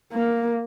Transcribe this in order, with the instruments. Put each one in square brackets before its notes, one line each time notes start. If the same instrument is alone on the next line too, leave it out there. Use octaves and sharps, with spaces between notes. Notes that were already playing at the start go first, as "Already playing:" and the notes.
[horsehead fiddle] A#3